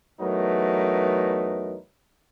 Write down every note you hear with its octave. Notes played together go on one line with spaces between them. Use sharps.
E2 F#3 A3 D#4 A#4 B4